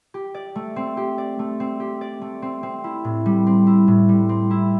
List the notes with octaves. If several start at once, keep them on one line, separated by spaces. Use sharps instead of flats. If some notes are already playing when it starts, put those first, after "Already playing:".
G4
D5
A3
C4
G4
D5
A3
C4
G4
D5
A3
C4
C4
E4
A2
G3
C4
E4
A2
G3
C4
E4